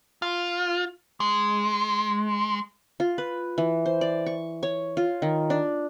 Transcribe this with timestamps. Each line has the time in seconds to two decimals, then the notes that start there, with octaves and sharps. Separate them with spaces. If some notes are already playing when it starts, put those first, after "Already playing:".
0.22 F4
1.20 G#3
3.00 F4
3.18 B4
3.58 E3
3.86 C5
4.01 D5
4.26 C#6
4.63 C#5
4.97 F4
5.22 D#3
5.50 D4